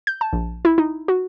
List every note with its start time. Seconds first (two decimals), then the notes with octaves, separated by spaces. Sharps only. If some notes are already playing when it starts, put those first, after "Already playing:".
0.07 G6
0.21 A5
0.33 A#1
0.65 E4
0.78 D#4
1.08 F#4